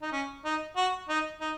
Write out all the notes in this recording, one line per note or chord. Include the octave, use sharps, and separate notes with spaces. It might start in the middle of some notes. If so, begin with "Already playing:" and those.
D#4
C#4
D#4
F#4
D#4
D#4